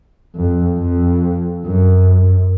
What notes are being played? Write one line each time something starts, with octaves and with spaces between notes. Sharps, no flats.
F2
F2
F#2